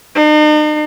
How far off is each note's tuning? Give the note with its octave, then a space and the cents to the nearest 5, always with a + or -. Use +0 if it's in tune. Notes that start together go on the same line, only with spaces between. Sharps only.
D#4 -45